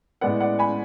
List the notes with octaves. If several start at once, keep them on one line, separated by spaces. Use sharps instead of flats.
A2 G#3 B3 D5 F#5
D5 F#5
G#5 B5